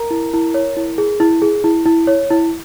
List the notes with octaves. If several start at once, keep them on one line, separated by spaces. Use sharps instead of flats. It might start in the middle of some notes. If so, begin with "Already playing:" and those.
Already playing: A#4 A#5
E4
E4
C#5
E4
G#4
E4
G#4
E4
E4
C#5
E4